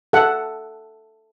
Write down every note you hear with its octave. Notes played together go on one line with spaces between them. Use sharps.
A4 F#5